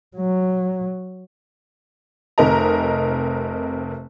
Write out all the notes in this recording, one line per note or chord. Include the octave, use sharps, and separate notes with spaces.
F#3
F1 C3 A#4 D#5 A#5